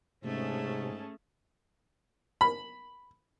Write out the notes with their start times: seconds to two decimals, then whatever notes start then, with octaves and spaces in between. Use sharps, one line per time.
0.24 G#2 C3 A3 C#4 G#4 A5
2.41 B5